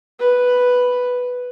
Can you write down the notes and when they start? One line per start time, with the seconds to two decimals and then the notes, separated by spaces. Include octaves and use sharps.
0.19 B4